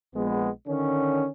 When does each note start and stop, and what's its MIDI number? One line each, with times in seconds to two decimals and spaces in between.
0.15 0.49 34
0.15 0.49 56
0.15 0.49 59
0.67 1.27 50
0.67 1.27 51
0.67 1.27 61